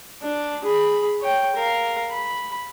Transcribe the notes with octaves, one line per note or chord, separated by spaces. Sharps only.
D4
G#4 B5
C#5 G5
A#4 F5
B5